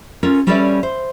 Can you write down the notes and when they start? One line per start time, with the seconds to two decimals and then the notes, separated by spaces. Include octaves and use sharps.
0.23 C#4 F4 A4 A#4
0.47 G3 C#4 A4 B4 D5 E5
0.83 C5